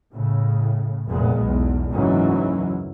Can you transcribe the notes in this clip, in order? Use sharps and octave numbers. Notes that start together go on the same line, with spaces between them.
A2 C#3
F1 A#2 G#3 B3
B1 E2
F#1 D2 G#2 E3 F#3 C#4